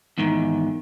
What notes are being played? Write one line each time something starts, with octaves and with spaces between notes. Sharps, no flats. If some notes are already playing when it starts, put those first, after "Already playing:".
E2 G#2 D#3